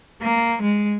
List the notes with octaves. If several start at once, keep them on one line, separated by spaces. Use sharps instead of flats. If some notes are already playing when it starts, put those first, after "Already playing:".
A#3
G#3